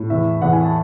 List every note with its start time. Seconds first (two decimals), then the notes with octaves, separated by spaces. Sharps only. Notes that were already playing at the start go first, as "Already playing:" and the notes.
Already playing: A2
0.10 E2 E5
0.42 E2 F#5
0.53 G#5
0.64 A5